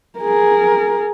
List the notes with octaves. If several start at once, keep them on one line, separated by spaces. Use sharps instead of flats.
G#4 A#4